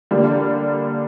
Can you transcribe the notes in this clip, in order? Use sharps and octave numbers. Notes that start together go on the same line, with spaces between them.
D3 G3 A#3 D4